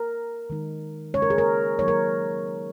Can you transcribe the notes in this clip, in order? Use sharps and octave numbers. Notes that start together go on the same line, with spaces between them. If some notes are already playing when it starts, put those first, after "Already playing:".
Already playing: A#4
D#3 G#3 D#4
C#3 G#3 C#4 C#5
A#4
G#4
A#4
D#3 F#3 A#3 D#4 C#5
A#4